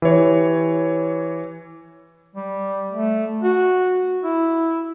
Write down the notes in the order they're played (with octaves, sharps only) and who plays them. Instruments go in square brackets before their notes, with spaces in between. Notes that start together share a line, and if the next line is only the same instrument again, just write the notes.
[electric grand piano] E3 G4 C#5
[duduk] G3
A3
F#4
E4